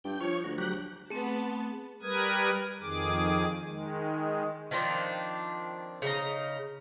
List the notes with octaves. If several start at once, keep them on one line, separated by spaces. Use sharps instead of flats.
G2 G5
F3 C#5 C#6
D2 F#4
F#3 G4 F#6
A3 B3 C4 G#4 A5
G3 A#4 B4 D#6 G#6
F2 D#3 G#4 D6
D#3 G#3
D#3 F3 C4 D4
C#3 D#4 A#5